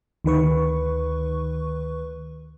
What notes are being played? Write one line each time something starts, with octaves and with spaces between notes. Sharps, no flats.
D2 D#3 B4 C#6